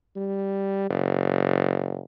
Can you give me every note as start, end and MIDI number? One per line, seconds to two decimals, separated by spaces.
0.16 0.88 55
0.90 2.00 30